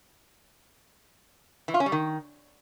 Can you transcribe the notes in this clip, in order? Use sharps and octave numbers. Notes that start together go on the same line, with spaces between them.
E3
F4
C#4
G3
D#3